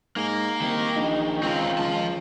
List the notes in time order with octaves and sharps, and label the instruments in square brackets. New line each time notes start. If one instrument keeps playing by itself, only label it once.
[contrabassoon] G#2 [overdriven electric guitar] A#3 A#4
[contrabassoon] C2 [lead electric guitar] D#3
[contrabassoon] A#1 [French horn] D#4
[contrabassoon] C#2 [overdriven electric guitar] C4 A#4 [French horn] F4
[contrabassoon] C#2 [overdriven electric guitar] F3 A5